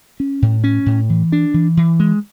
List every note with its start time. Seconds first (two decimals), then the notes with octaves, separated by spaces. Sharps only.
0.20 C#4
0.42 A2
0.64 C#4
0.86 A2
1.09 E3
1.32 D4
1.54 E3
1.77 E3
2.00 G#3